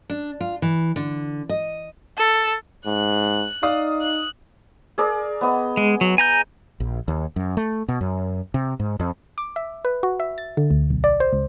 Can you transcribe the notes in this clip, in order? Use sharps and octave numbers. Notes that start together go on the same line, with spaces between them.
D4
F4
E3
D3
D#5
A4
G#2 F#6
D#4 D5 F5 D#6
F#6
G#4 A#4 D5
B3 D#5
G#3
F#3
G#5 A#5 G6
A#1
D#2
F#2
A3
B2
F#2
C3
G#2
F2
D6
E5
B4
F#4
E5
A6
D3
D2
B1
D5
C5
C#2